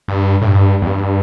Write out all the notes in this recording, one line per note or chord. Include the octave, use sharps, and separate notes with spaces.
G2
A2
G2
E2
G2